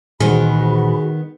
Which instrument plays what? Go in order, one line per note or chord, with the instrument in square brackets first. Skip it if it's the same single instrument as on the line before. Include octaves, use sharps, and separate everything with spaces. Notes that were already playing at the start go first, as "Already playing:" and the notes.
[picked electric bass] A#2 E3 [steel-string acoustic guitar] D#3 B3 [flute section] F#4 B5 [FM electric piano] G#4 C5